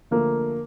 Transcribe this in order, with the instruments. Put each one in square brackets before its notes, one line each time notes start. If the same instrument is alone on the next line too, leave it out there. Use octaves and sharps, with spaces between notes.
[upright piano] D3 F3 A3 [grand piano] A#3